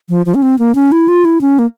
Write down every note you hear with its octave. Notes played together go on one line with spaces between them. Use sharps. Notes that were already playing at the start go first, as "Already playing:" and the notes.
F3
F3
C#4
C4
A#3
C#4
E4
F4
E4
C#4
A#3